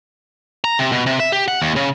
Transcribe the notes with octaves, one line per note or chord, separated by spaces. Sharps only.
A#5
C3
B2
C3
E5
G4
F#5
D#2
C#3